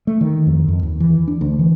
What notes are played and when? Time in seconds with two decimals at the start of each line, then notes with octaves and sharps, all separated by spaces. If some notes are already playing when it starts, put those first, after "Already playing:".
0.07 A3
0.21 D#3
0.47 F2
0.68 F2
0.83 D#2
1.00 E3
1.28 D4
1.41 D2
1.59 E3